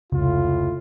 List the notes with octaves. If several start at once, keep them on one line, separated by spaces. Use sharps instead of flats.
F1 C#2 A2 C#3 F4